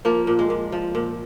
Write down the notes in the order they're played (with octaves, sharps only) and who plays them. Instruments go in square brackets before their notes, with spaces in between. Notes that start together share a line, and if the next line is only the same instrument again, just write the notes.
[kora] F3 A#3
A#2
G#3
A#2
F3
A#2